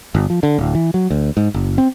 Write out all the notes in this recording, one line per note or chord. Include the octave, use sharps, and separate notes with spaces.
G1
F3
D3
D1
E3
F#3
D2
G#2
F#1
C4